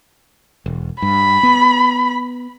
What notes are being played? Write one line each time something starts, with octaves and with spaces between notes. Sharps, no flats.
E1
G2 B5
B3